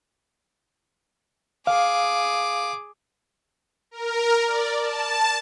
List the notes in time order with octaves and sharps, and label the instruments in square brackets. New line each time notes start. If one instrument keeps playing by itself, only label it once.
[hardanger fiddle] G#4 D6 [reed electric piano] F5
[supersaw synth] A#4
D5
A5